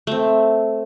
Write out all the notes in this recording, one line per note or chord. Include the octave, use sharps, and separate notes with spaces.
A3 C4